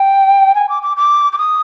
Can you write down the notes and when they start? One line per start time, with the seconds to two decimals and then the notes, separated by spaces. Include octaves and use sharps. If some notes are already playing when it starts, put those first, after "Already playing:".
Already playing: G5
0.55 G#5
0.69 D6
0.82 D6
0.97 D6
1.33 D6
1.38 D#6